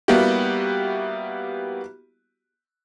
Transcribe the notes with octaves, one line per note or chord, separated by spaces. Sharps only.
G3 A#3 B3 E4 F#4 G4